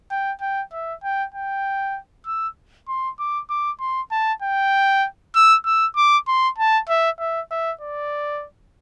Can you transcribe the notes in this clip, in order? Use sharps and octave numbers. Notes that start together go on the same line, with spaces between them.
G5
G5
E5
G5
G5
E6
C6
D6
D6
C6
A5
G5
E6
E6
D6
C6
A5
E5
E5
E5
D5